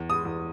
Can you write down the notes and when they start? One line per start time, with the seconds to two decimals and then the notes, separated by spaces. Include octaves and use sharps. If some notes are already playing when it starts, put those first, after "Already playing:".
Already playing: E2
0.10 D#6
0.25 E2